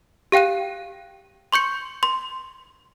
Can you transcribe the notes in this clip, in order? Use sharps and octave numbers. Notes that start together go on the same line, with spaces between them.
G4 F5 G5 F#6 D#7
C6 C#6 G6 C#7
C6